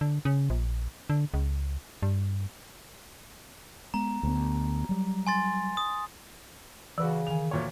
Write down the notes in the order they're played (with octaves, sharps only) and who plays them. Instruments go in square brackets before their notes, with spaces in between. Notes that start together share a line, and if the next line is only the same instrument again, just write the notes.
[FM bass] D3
C#3
A#1
D3
C#2
G2
[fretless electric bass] G#3 B3 [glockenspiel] A#5
[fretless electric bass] D2 B3
F#3 G3
[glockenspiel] G#5 C6 A6
D#6
[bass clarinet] C#3 [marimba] E3 [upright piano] F#4 B4 D5
[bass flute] D#3 [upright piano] G#5 F7
[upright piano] D2 A#2 C#5